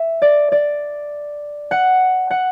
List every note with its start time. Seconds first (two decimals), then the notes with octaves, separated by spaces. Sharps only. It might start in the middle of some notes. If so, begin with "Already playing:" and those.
Already playing: E5
0.22 D5
0.52 D5
1.71 F#5
2.31 F#5